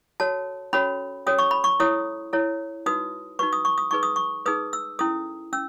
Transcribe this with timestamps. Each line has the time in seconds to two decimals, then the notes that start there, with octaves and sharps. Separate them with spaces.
0.20 F#4 A4 C#5 A5
0.73 C#4 F#4 A4 C#5 B5
1.26 C#4 F#4 A4 C#5 D#6
1.38 C#6
1.51 B5
1.64 C#6
1.80 E4 A4 C#5 D#6
2.33 E4 A4 C#5
2.86 D#4 F#4 B4 D#6
3.39 D#4 F#4 B4 C#6
3.53 D#6
3.65 C#6
3.78 D#6
3.91 D#4 G#4 B4 C#6
4.03 D#6
4.16 C#6
4.46 D#4 G#4 B4 D#6
4.73 E6
4.99 C#4 E4 A4 D#6
5.53 C#4 E6